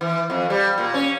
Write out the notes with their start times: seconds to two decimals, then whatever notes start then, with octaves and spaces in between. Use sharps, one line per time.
0.01 E3
0.30 F2
0.50 G3
0.78 A#2
0.94 C#4